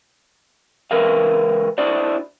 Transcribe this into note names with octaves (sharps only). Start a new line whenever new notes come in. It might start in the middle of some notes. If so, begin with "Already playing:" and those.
C#2 E3 A#4 B4 E5 F5
D4 E4 F#4 C5 D5